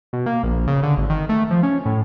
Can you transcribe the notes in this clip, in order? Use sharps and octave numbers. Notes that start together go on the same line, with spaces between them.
B2
A#3
A#1
C#3
D3
G#1
D#3
A3
F3
C#4
A2